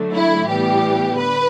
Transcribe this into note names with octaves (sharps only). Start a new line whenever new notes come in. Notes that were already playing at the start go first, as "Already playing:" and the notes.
Already playing: D3 F#3 A3
E4
A2 E3 G3 B3 G4
D3 B4